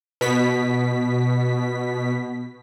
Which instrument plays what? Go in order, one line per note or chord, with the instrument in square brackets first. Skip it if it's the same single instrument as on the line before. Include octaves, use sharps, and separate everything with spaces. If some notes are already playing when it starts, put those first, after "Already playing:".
[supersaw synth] B2 B6